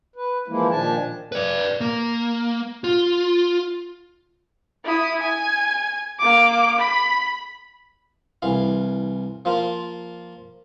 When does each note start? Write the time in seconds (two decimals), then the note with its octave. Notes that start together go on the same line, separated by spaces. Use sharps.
0.16 B4
0.48 E3 F3 G#3 A#3 E4
0.71 A#2 D#3 F3 D4 G#5 A5
1.32 B4 D5
1.81 A#3
2.84 F4
4.85 E4 D#6
5.21 G#5
6.19 A#3 D6
6.79 B5
8.42 C2 E3 F5
9.45 F3 A#3 F4